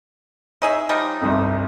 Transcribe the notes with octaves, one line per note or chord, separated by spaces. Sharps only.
D#4 G#4 C#5 E5
F3 G3 D#4
G1 C2 F2